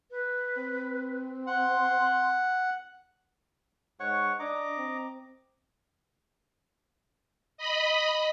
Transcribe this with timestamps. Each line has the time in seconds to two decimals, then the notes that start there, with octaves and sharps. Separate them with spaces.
0.11 B4
0.57 C4
1.47 F#5 C6
4.00 G#2 C#5 F#5 C#6
4.39 D4 D#5 A#5 D6
4.77 C4
7.58 D#5 B5